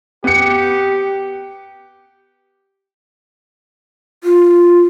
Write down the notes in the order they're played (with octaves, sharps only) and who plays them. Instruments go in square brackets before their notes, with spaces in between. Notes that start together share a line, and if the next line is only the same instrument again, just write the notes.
[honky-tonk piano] B3 C#7 [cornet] G4
[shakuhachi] F4